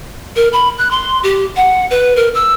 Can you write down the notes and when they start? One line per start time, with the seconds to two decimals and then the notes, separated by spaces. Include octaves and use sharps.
0.36 A#4
0.53 B5
0.78 F#6
0.91 C6
1.23 G4
1.56 F#5
1.91 B4
2.16 A#4
2.34 E6